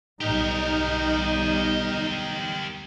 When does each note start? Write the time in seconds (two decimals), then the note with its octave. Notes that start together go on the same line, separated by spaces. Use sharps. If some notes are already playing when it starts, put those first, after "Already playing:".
0.21 B1 G3 D#4 G4 A#4